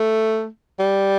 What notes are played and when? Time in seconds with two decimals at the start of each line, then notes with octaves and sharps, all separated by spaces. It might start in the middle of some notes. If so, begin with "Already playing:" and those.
Already playing: A3
0.79 G3